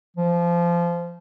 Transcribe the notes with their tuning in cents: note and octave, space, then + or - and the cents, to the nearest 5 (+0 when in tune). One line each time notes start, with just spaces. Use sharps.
F3 -20